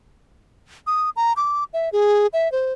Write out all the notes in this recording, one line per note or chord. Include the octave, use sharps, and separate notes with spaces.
D#6
A#5
D6
E5
G#4
E5
C5